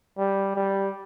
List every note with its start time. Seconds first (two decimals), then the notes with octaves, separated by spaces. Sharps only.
0.18 G3
0.55 G3